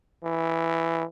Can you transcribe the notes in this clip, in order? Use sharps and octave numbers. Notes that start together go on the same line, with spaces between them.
E3